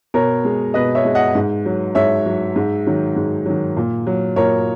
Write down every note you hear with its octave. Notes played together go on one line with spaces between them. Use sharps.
B2 A#4 C#5
G#3
B2 B4 D#5
C#5 E5
G#3
D#5 F#5
G#2
F#3
G#2 C#5 E5
F#3
G#2
D#3 F#3
G#2
D#3 F#3
A#2
F#3
A#2 A#4 C#5